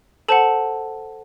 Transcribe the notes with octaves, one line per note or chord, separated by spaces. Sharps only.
A4 C5 F#5 A5